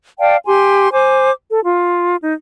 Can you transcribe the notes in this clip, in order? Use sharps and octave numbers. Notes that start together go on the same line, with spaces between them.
D5 F5 G5 A5
G4 G#5 C6
C5 G#5 D6
A4
F4
D#4